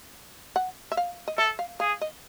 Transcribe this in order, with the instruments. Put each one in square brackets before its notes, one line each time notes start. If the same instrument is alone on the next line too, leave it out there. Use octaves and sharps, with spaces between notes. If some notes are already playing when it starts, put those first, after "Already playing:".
[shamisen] F#5
E5
F5
D#5
[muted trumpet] A4 [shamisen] E5
[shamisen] F5
[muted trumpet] G#4 [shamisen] F5
[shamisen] D#5